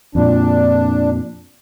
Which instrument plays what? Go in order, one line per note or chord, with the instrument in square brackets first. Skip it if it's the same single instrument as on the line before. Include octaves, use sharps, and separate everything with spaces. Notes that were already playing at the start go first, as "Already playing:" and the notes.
[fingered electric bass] F2 A#2 [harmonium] D4